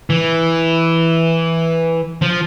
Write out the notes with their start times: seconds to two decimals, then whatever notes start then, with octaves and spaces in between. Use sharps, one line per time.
0.10 E3
2.22 F3